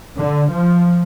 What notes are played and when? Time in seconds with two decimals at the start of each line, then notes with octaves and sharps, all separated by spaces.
0.19 D3
0.52 F3